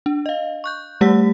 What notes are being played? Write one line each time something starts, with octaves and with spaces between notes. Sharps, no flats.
D4
D#5 F5
C#6 F#6 G6
G3 A3 G4 F#5 E6 B6